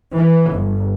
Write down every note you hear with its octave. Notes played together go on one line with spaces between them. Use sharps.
E3
G1